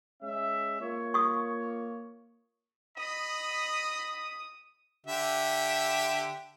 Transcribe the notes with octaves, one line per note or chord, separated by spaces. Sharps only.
G#3 C#4 E5
A#3 F4 C#5
C#6 D#6
D#5 B5 D#6
D3 G4 E5